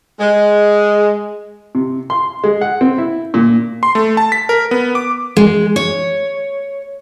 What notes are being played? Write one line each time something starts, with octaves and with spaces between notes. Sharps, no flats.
G#3
C3
C6
G#3
F#5
C4
E4
A#2
C6
A3
A5
B6
A#4
B3
D6
G#3
C#5